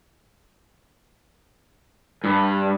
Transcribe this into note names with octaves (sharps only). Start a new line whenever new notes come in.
G2